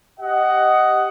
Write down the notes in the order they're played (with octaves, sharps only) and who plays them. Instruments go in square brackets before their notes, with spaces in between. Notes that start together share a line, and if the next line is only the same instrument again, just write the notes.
[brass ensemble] G4 D#5 F#5